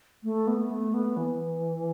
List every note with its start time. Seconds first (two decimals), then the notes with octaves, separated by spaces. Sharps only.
0.24 A3
0.47 B3
0.71 A3
0.94 B3
1.17 E3